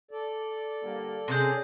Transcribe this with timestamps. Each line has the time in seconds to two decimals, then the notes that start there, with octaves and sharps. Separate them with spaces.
0.11 A4 D5
0.83 D3 G3 A#3
1.28 C3 D#3 G#3 C#4 G#4 G6 A#6